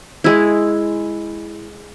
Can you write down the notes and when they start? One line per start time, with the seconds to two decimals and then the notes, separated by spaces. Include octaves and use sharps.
0.24 G#3 E4